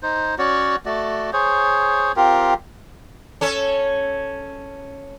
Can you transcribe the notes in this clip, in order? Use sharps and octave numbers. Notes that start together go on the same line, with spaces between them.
D#4 C5
C#4 F#4 C#5 D5
A3 F#4 D5
G#4 C5 C#5
C4 F4 G4 A#4
C#4 A4 C#5